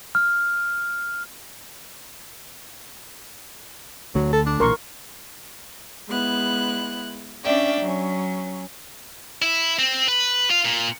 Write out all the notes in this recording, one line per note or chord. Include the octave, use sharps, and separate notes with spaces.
F6
D2 D3 F#3 A3
A4
D4
B1 A#2 E3 A#4 C6 C#6
G#3 B3 E4 F#6
C#4 D4 D5 E5 G5
F#3 C#4
E4
C4
B4
F4
A#2